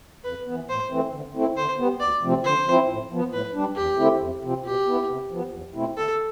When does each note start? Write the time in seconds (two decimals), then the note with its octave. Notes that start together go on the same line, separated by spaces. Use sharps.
0.24 F2 B4
0.46 E3 B3
0.69 A2 C5
0.90 E3 A3 C4
1.12 D3
1.34 A3 C4 E4
1.56 D3 C5
1.78 G3 B3
2.00 D2 D5
2.23 C3 F3 A3 C4
2.44 D3 C5
2.66 F3 C4 E4
2.88 A2
3.11 F3 B3
3.32 A2 B4
3.55 G3 D4
3.76 E2 G4
3.98 D3 A3 C4 E4
4.20 F2
4.43 C3 F3 C4
4.65 B2 G4
4.87 B3 E4
5.08 C3
5.31 F3 B3
5.52 E2
5.75 B2 A3 C4 E4
5.96 D3 A4